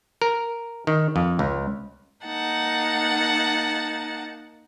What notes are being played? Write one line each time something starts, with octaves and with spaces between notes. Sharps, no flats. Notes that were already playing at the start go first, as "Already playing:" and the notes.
A#4
D#3
F2
C#2
A#3 D#4 F#5 A5